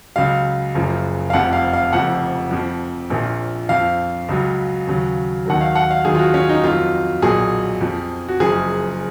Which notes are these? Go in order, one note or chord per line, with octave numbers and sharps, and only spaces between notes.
C#2 C#3 F#3 F5
F#1 F#2 C#3 F3
F5
F1 F2 F3 F#5
F5
F5
F1 F2 C#3 F3 F#5
F2 F3
A#1 A#2 F3
F2 F3 F5
C#2 C#3 F#3
D#2 C#3 F#3
D#2 D#3 F#3 F#5
F5
F#5
F5
D#2 D#3 F#3 G#4
F4
F#4
C#4
D#4
F2 D#3 F#3 F4
B1 A#2 F#3 G#4
F2 F3
F#4
F#1 F#2 F3 G#4